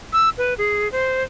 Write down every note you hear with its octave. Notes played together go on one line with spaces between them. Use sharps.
E6
B4
G#4
C5